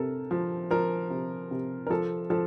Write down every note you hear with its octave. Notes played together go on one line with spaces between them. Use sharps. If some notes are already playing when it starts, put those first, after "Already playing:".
Already playing: C3 A4 A#4
F3
F3 A#4
C3
C3
A#4
F3 A4
F3 A4